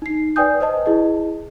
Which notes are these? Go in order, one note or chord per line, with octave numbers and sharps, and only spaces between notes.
D#4 C7
B4 D5 G5 G#5 D#6 G6
B4 C5 D#5 A5
E4 G#4 D#5